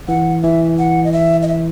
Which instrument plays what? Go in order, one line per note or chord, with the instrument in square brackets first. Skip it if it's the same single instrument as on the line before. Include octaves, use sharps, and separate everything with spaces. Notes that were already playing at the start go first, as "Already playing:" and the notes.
[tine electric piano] E3 [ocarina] F#5
[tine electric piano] E3 [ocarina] E5
[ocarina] F#5
D#5
E5
D#5
E5